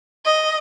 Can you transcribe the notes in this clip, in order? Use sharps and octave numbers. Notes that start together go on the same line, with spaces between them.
D#5